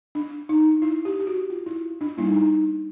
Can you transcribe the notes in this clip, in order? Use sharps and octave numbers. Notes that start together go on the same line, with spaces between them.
D4
D#4
E4
G4
G4
F#4
F4
E4
D4
G3 A#3 D4 E4
D#4
D4
D#4